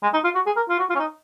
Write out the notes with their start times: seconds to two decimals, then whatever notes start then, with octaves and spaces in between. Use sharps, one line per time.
0.03 G#3
0.14 D#4
0.24 F4
0.35 F#4
0.46 G#4
0.56 A#4
0.69 F4
0.79 F#4
0.90 F4
0.95 C#4
1.00 D#4